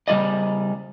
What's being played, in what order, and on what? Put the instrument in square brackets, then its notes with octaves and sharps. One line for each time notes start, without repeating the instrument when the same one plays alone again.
[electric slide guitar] C#3 G3 F#4 D5 D#5